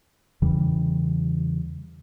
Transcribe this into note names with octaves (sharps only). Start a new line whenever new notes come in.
E2 C#3 E3 G3